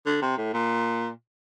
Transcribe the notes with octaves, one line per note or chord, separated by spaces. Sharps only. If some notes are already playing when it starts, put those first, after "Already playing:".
D3
C3
A2
A#2